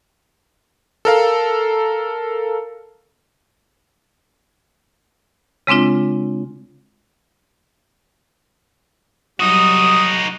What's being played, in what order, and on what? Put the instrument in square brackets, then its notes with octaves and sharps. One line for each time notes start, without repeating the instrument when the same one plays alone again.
[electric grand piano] A4 A#4 F5
[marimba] C#3 G#3 C4 D4 F4
[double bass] F#3 G3 [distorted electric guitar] D#4 F#4 [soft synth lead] D#6